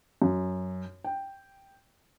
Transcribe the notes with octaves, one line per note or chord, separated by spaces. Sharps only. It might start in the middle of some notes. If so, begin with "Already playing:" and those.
F#2
G5